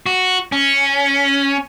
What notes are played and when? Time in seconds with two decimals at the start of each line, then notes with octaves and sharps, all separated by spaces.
0.06 F#4
0.52 C#4